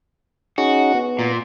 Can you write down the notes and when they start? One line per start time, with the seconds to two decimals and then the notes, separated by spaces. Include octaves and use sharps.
0.58 C#4 D#4 F#4 G#4
0.95 B3
1.19 A#2